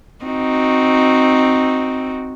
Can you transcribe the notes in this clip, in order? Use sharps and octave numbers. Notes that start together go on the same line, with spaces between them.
C4 D#4 F#4